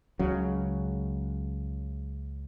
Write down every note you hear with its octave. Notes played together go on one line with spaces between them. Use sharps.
C#2 C#3 F#3